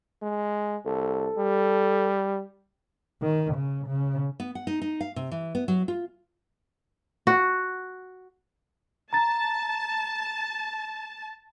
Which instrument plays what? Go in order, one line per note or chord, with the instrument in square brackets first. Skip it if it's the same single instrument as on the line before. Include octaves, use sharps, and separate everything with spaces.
[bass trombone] G#3
[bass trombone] C2 [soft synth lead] A4
[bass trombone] G3
[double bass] D#3
C#3
C#3
[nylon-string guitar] B3
F#5
D#4
D#4
F5
C3
E3
B3
F#3
F4
[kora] F#4
[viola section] A5 [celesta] A#5 A6